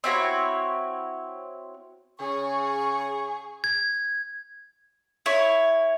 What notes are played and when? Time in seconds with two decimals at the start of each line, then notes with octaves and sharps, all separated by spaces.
0.04 C4 E4 F#4 C#5
2.19 C#3 G#4 C#6
3.64 G#6
5.26 E4 C#5